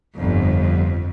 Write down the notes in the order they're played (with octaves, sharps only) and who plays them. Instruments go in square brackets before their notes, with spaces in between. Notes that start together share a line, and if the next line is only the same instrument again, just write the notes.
[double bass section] G1 [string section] F2